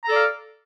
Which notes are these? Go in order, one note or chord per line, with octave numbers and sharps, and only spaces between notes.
A4 D5 F5 A#5